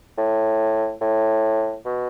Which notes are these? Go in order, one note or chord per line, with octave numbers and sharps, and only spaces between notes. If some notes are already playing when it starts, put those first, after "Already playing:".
A2
A2
B2